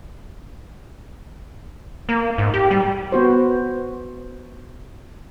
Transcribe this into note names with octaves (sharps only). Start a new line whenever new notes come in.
A#3
G#2
G4
G3
B3 F#4 C5